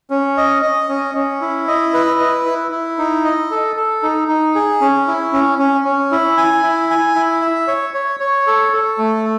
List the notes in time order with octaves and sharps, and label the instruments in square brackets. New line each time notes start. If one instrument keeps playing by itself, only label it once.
[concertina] C#4
D#5
D#5
C#4
C#4
E4
D#5
B4
E4
E4
E4
D#4
D#5
A4
A4
D#4
D#4
G#4
C#4
E4
C#4
C#4
C#4
E4
G#5
E4
G#5
E4
E5
C#5
C#5
C#5
A4
A4
A3